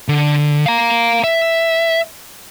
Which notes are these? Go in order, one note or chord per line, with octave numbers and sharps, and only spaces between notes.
D3
F5 A#5
E5